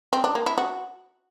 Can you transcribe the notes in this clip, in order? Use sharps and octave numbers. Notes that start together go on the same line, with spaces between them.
C4
D4
A#3
E4
F#4